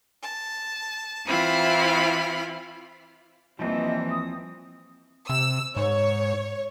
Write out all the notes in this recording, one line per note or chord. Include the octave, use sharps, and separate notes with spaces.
A5
E3 C4 E4 F4 B5 F6
D#2 E3 F3 G3 C4 D#5
D#6
C3 E6
G#2 C#5